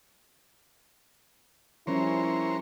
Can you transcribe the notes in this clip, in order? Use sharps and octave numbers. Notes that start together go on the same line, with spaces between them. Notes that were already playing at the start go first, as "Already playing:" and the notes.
F3 G3 C#4 E4 A#4 C5 C#5